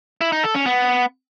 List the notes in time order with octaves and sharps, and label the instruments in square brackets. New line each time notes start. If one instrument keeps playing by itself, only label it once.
[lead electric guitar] E4
D#4
A4
C#4
B3